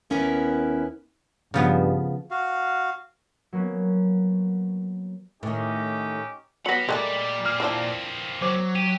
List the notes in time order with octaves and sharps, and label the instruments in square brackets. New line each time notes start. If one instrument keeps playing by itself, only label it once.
[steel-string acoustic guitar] D#2 B3 C#4 E4 A#4 B4
[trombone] G2 [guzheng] C#3 F3 B3
[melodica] F#4 F5
[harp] F#3 A#3 B3 C#4
[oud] A2 D#3 [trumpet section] C#4 D#4 G4
[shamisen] F#3 B3 [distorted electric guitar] G3 B5 [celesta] A#6 B6 C#7
[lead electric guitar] A#2 D5 [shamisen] G#3 A3 A#4
[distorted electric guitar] A#3 C4 [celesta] F6
[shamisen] E3 F3 D4
[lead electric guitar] F#3 [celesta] C5 D6
[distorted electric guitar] G4 [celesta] D#7